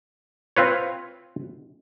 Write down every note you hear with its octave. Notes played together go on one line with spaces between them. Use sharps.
C4 F4 B4 C#5